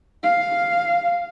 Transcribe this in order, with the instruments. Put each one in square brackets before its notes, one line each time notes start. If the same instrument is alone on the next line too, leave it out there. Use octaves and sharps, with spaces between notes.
[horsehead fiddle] F5